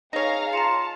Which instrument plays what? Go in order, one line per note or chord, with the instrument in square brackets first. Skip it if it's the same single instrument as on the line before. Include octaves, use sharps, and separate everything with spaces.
[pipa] D#4 C#5 [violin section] G#4 F5 A#5 [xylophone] A#6
[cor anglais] F4 [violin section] A5 [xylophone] A#5 C#7